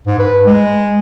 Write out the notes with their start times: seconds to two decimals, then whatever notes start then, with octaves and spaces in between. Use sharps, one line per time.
0.07 G#2
0.19 B4
0.46 G#3